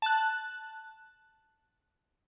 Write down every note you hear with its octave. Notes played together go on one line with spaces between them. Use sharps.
A5 F#6